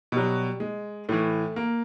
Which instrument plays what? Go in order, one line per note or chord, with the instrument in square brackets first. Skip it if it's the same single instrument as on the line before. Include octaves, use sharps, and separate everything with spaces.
[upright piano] B2 F#3 G3
G#3
A2 E3 A3
A#3